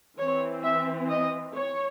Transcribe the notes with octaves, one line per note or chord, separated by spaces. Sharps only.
E3 C4 C#5
E5
D#5
C#5